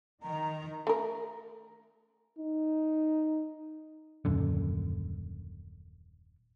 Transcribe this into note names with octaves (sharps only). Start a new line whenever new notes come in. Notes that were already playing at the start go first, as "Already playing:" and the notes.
D#3 A#5
A3 A#4
D#4
D#1 F#2 D3